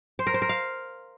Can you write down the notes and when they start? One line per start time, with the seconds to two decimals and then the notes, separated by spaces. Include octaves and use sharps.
0.19 C5
0.27 A#4
0.34 C5
0.42 A#4
0.49 F5